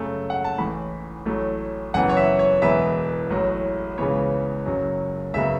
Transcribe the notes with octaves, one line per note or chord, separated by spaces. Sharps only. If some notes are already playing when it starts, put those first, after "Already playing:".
Already playing: F#2 C#3 A3
F#5
A5
A1 A2 E3 B5
A1 A2 F#3 A3
F#1 F#2 E3 B3 F#5
C#5
E5
C#5
E1 E2 E3 B3 E5
A1 A2 F#3
C#2 C#3 E3 B3 C#5
F#1 F#2 F#3
F#1 F#2 C#3 F#3 B3 E5